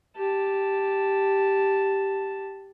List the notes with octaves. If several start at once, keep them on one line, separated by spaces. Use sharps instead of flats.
G4 A5